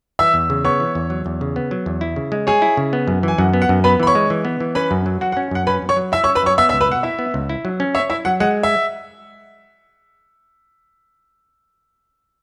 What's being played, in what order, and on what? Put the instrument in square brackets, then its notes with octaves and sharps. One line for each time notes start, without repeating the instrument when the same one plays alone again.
[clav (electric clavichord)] E3 [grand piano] E5 E6
[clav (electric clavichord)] E2
C#3
[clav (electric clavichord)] B3 [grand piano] C#5 C#6
[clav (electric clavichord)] E3
E2
F#3
E2
C#3
B3
F#3
E2
E4
C#3
G#3
[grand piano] G#4 G#5 [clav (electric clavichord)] C#5
[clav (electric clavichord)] E4
C#3
B3
F#2
[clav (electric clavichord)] E3 [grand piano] G#5
[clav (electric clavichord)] F#2 [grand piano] F#5
[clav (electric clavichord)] B3
[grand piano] F#5
[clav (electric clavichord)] F#2
[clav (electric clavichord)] B3 [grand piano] B4 B5
[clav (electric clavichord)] E3 [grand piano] B5
[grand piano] C#5 C#6
[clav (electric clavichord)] G#3
E3
B3
E3
[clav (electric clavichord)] C#4 [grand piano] B4 B5
[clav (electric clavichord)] F#2
F#3
[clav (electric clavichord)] F#4 [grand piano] F#5
[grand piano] F#5
[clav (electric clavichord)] C#4
[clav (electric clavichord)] F#2 [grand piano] F#5
[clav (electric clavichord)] C#4 [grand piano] B4 B5
[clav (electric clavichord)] F#2
[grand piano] C#5 C#6
[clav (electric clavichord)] F#3
[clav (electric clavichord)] E4 [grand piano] E5 E6
[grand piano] C#5 C#6
[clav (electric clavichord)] C#4
[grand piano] B4 B5
[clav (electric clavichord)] F#2 [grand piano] C#5 C#6
[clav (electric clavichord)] B3 [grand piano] E5 E6
[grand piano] E5 E6
[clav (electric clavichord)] C#2
[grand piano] B4 B5
[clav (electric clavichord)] B2 [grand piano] F#5
[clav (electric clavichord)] E4 [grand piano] E5
[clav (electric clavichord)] B3
C#2
E4
F#3
C#4
[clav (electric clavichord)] C#5 [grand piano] E5
[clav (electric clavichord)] E4 [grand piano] E5
[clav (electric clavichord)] F#3 [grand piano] F#5
[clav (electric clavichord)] G#3 [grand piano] F#5
[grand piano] E5